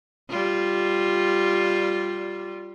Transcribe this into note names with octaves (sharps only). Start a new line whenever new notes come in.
G3 F4